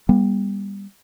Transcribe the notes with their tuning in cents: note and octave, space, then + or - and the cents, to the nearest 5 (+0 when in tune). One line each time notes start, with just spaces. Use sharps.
G3 +20 B3 -35